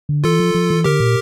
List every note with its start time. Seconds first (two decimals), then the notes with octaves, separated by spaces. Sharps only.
0.09 D3
0.24 E3 F4 A4
0.40 F3
0.55 F3
0.70 E3
0.84 D3 G4 A#4
1.00 A#2